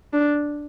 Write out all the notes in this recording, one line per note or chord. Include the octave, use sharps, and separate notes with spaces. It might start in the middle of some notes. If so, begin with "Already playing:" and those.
D4